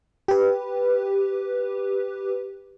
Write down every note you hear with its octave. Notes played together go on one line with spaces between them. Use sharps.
G4 B4